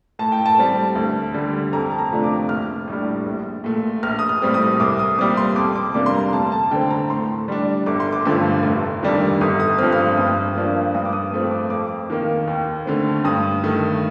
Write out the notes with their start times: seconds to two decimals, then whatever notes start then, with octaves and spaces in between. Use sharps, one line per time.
0.19 A2 A5
0.32 G5
0.46 A5
0.58 G3 C4
0.95 D2
1.34 D3 G3
1.72 F2 A#5
1.90 A5
1.99 A#5
2.11 C3 F3 A3 D4
2.24 D6
2.49 A#1 F6
2.88 A2 G3 D4
3.26 A#1
3.64 A#2 A3
4.03 A#1 F6
4.19 D#6
4.29 F6
4.42 A2 G3 C4
4.54 D#6
4.80 C2 D6
4.99 D#6
5.18 A#2 G3 C4 D6
5.37 C6
5.56 F2 D6
5.76 D6
5.94 C3 G3 A#3 D4 D6
6.06 C6
6.15 A#5
6.33 D2 A5
6.52 A5
6.64 A5
6.71 D3 A3 C4 G5
6.91 A#5
7.10 A2 C6
7.48 G3 D4
7.86 G1 D6
8.00 C6
8.13 D6
8.25 G2 D3 F3 A3
8.63 F1
9.03 F2 D#3 G3 D4
9.41 G1 D#6
9.60 D#6
9.78 G2 F3 C4 F6
9.92 F6
9.98 D#6
10.17 G2 D#6
10.55 F3 A#3 D4
10.94 G2 D#6
11.05 D6
11.13 D#6
11.32 F3 A3 C4
11.51 D6
11.70 F2 D6
12.10 D#3 A#3
12.48 D#2
12.86 D3 A3 C4
13.24 G2 D#6
13.63 D#3 A3